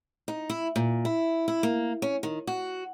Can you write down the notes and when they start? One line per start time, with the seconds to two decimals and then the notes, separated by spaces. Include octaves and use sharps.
0.28 D#4
0.50 E4
0.76 A#2
1.05 E4
1.48 E4
1.63 A#3
2.02 C#4
2.23 D#3
2.47 F#4